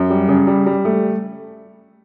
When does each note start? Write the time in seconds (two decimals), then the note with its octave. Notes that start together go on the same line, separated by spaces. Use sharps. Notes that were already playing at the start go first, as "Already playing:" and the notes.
Already playing: F#2
0.10 G3
0.28 C#3
0.47 G3
0.66 G3
0.85 A3